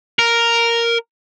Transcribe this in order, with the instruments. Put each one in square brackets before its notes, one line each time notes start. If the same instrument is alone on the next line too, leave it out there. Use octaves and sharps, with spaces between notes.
[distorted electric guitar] A#4